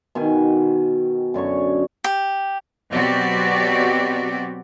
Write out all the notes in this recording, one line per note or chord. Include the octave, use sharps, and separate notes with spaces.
B2 D#3 G5 G#5
F#2 D3 C#5 C#6
G4
B2 F#3 C4 F#4 G4 D5